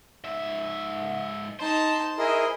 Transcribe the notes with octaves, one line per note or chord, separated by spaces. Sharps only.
G#2 E5
D#4 C5 A5
E4 G#4 A#4 D#5